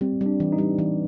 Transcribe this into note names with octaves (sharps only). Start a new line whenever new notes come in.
G3 C4
G3
D4
E3
D#4
G3
E3